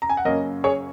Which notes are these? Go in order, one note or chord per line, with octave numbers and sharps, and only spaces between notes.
A#5
G#5
F#5
F#2 C#3 A#3 C#4 A#4 D#5
G#4 C#5